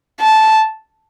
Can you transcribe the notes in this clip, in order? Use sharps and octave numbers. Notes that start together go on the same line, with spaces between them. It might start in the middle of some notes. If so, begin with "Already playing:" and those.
A5